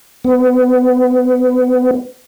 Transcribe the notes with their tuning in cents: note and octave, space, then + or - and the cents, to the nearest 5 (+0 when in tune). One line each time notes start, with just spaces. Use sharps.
B3 +30